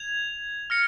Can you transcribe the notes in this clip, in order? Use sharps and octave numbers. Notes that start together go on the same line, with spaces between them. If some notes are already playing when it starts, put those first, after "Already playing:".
Already playing: G#6 F7
F6 A#6 C#7